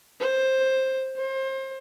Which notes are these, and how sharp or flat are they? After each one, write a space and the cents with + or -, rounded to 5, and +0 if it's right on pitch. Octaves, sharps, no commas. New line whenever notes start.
C5 +10
C5 +30